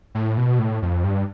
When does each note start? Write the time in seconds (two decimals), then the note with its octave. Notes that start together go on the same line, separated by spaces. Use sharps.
0.15 A2
0.37 B2
0.59 A2
0.82 F2
1.04 G2